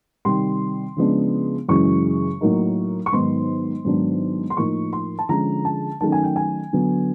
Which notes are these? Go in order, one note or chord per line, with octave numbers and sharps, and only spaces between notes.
C3 D#3 G3 C6
C#3 F3 G#3 B3 D4
F#2 C#3 E3 G#3 C#6
A2 F#3 A#3 D#4
C#6
G#2 D#3 F#3 B3 D#4 C6
G#2 D#3 F#3 B3 D4
C6
A2 F3 A#3 D#4 C#6
C6
A5
D3 F3 G#3 C#4 A#5
A5
D#3 F#3 A3 C#4 A5
G#5
G5
G#5
D3 F#3 B3